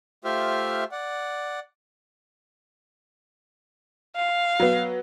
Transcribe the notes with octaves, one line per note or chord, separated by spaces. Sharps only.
A3 F4 G4 C5 E5 F6
D5 F#5
F5
F#3 B3